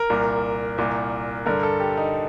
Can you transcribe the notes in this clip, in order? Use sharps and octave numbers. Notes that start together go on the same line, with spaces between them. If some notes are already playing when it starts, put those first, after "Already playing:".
Already playing: A#4
C2 A#2
C2 A#2
G2 D3 A#4
A4
G4
D#4